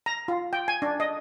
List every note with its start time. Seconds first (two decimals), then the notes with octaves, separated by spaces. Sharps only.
0.06 A#5
0.28 F4
0.53 G5
0.68 G#5
0.82 D4
1.00 D#5